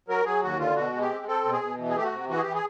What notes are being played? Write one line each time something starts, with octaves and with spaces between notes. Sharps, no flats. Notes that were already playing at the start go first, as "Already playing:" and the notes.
F#3 A#4
F#3 G#4
D#2 F#4
D3 F4
B2 F#4
G#3
G4
C4
C4 A4
B2
G#4
B2
E3
G#4
A3 G4
F#4
C3
E3 F#4
G#4
E3 G4
G#4